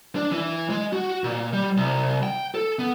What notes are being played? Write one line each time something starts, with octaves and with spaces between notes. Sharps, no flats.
D4
E3
G#3
F#4
A#2
G3
C2
G5
A4
B3